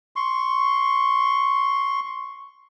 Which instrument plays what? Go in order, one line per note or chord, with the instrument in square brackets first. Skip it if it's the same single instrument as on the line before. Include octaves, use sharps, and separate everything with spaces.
[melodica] C6 C#6